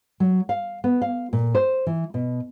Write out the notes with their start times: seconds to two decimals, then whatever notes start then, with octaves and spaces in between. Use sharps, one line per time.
0.20 F#3
0.49 F5
0.84 B3
1.02 F5
1.33 A#2
1.55 C5
1.87 E3
2.14 B2